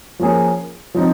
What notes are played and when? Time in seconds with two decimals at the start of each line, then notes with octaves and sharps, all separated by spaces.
0.19 F3 A#3 C#4 G#4
0.94 F3 C4 D#4